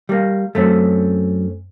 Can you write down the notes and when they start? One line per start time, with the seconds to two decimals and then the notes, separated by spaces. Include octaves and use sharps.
0.09 G3 A#3
0.55 F#2 A3 C4 C#4